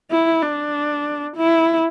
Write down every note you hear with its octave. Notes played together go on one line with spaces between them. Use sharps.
E4
D4
E4